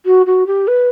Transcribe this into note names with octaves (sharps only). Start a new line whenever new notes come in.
F#4
F#4
G4
B4